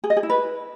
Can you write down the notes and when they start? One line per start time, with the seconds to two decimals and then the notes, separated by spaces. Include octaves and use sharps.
0.04 G#4
0.10 D#5
0.17 G#4
0.23 E4
0.30 B4